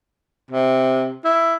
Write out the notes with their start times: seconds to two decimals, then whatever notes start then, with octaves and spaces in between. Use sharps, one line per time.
0.51 C3
1.25 E4